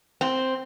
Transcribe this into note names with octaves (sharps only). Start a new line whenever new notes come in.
C4